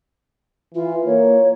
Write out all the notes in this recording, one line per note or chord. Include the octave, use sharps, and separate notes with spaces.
E3 F4
A#3 C#5